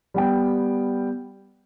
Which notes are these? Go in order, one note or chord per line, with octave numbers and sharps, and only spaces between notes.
G3 B3 G5